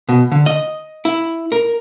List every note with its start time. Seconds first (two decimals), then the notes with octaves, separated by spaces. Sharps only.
0.09 B2
0.32 D3
0.46 D#5
1.05 E4
1.52 A#4